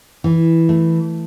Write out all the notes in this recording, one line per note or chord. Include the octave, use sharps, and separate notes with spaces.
E3
A3